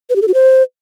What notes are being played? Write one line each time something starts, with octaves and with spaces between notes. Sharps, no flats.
B4
G4
A4
F#4
C5